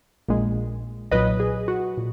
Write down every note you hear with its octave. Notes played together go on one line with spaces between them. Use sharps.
A#1 A#2 G#3
B1 A#2 F#3 B4 D#5
G#4
F#4
A#2